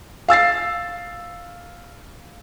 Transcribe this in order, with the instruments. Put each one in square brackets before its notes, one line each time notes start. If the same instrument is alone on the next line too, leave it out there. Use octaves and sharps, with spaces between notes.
[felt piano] F5 E6 A6 C7